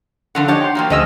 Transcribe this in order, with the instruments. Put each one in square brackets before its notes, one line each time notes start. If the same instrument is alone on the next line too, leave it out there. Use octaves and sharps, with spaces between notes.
[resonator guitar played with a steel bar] D3 F3 D4 [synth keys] F#5
[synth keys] D4 D#4 [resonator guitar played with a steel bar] G4 C#5 F#5
[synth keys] G5 C6
[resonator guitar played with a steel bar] F3 F#3 A#3
[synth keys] D2 D#5 E6 [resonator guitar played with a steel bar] F3 C#4 G#4